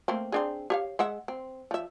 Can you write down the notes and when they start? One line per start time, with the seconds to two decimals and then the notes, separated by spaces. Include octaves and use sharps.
0.08 A3 A#3 C4
0.32 C4 D4 G#4
0.70 G4 C#5 F5
0.99 G#3 E5 F#5
1.28 C4
1.71 F3 E5